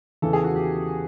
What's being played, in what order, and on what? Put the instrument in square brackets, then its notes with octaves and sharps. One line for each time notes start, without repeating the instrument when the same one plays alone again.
[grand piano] E2 C#3 E3 A4
G#4
F#4
G4